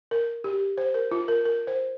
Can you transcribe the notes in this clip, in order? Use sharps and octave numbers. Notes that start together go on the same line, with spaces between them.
A#4
G4
C5
A#4
F4
A#4
A#4
C5